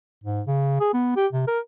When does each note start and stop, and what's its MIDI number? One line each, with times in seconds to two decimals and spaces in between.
0.24 0.41 44
0.47 0.78 49
0.80 0.89 68
0.94 1.15 59
1.16 1.27 67
1.33 1.45 48
1.48 1.60 70